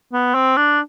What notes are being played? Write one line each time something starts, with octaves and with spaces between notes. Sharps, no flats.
B3
C4
D4